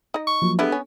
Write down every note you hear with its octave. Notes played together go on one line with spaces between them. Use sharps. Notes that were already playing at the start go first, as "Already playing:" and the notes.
D#4 D#5
C#6
F3 F#3 A#3
G3 G#3 B3 D4 E4 A4
C#4